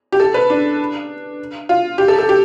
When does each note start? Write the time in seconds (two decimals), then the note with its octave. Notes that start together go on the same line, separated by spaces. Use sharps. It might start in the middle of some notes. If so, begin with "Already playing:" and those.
0.12 G4
0.20 A4
0.34 B4
0.50 D4
1.69 F4
1.98 G4
2.08 A4
2.18 A4
2.29 G4